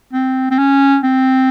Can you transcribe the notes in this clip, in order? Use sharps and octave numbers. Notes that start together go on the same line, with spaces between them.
C4
C4
C#4
C4